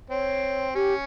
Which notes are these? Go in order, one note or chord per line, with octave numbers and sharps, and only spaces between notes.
C4 C#5
C#4 G4